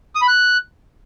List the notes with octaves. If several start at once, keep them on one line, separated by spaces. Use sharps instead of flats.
D#6
B5
F#6